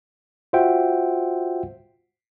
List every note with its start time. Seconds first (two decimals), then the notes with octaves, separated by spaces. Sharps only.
0.53 F4 F#4 C5 E5 F#5 G5